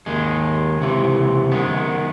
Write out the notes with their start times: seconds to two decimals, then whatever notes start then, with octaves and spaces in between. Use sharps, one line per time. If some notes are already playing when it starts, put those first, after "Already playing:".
0.06 D#2 D#3 G#3
0.79 C#2 C3 E3
1.52 F#2 D#3 G#3 B3